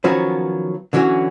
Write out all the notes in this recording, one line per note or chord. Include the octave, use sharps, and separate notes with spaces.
D#3 F3 F#3 B3 C#4
D3 E3 F#3 C#4 F#4